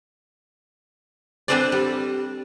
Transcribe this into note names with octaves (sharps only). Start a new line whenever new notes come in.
C4 D4 A4 B4 C5 D5
G3